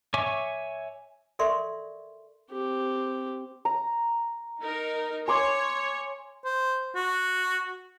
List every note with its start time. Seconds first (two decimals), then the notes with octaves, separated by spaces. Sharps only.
0.14 C#5 E5 G#5 C#6 D6
1.39 A4 A#4 D5 E5 C6 C#6
2.51 C4 G4
3.65 A#5
4.62 D#4 A#4
5.28 C#5 G#5 C6 D6
6.45 C5
6.95 F#4